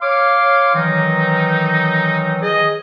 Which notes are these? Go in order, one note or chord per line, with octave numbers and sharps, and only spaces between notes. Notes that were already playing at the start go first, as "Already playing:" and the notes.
C#5 F5 C6 D6
D#3 E3 F#3 D#4
G#4 D#5